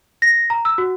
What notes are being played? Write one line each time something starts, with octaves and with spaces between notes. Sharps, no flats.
A#6
A#5
E6
F#4